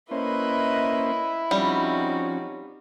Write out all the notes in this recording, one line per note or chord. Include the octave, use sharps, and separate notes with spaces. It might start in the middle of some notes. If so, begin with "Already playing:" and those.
A#3 C#4 E4 B4 C5 D#5 E5
F3 G3 C4 C#4 D#4 F#4